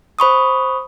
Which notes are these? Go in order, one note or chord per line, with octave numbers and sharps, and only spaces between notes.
C5 B5 C#6 D#6